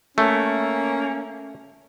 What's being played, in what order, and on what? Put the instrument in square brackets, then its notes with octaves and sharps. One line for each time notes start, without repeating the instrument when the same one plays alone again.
[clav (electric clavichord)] A3 [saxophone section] A#3 C#4